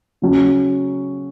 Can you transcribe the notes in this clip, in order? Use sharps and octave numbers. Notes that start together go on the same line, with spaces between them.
C#3 F#3 C#4